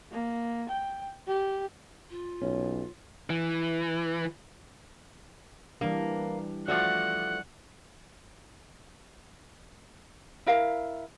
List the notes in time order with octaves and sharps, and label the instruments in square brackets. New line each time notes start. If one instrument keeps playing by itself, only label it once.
[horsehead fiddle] A#3
G5
G4
[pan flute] F4
[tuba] B1 [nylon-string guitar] C#4
[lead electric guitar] E3
[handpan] E3 G3 D4 [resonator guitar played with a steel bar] A#3
[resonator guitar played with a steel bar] F3 A3 F#4 [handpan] D5 [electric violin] F#5
[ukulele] E4 A#4 F5